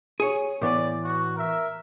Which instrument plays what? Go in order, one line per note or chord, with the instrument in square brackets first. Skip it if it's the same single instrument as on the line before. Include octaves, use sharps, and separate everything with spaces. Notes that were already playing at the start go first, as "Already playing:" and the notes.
[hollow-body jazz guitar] G#4 C#5
[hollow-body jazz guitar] A2 E3 B3 [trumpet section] D5
[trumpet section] F#4
A#4 E5